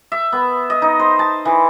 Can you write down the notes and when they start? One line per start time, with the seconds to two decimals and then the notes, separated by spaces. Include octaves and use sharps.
0.12 E5
0.32 B3
0.70 D#5
0.82 D#4
1.00 C5
1.19 A5
1.45 E3